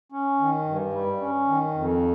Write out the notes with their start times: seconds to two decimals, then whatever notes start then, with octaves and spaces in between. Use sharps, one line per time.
0.12 C#4
0.39 D#3
0.66 G2
0.93 G3
1.20 C#4
1.47 D#3
1.74 F2